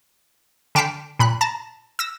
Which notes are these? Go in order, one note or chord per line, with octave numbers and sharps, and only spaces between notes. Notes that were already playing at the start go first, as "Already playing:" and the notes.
D3 G5 A5 F6 B6 C7
A#2 B5 F#6
A5 A#5 A6
E6 A#6